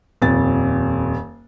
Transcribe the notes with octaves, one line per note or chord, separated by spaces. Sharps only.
D#1 F2 A6